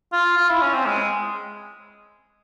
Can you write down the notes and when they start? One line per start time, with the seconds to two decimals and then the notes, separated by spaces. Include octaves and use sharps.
0.13 F4
0.37 F4
0.49 E4
0.62 C#4
0.74 C4
0.86 G#3